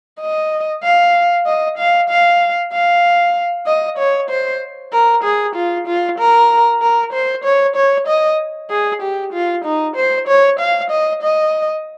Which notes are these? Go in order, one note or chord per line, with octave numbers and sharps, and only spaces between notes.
D#5
F5
D#5
F5
F5
F5
D#5
C#5
C5
A#4
G#4
F4
F4
A#4
A#4
C5
C#5
C#5
D#5
G#4
G4
F4
D#4
C5
C#5
F5
D#5
D#5